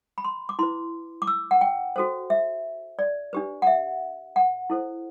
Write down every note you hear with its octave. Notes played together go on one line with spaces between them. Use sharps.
B5
C6
D6
E4 B4 C6
D6
E6
F#5
G5
F#4 A4 C5
E5
D5
D4 G4 B4
F#5
E5
F#5
E4 A4 C5